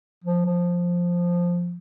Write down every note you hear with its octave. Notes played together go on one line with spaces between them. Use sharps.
F3
F3